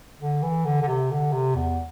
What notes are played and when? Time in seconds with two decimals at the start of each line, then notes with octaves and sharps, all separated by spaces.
0.21 D3
0.43 E3
0.65 D3
0.82 D3
0.88 C3
1.11 D3
1.32 C3
1.56 E2